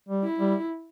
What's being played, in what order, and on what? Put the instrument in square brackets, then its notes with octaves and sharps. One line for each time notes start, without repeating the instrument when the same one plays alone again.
[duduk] G3
[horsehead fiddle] E4
[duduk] G3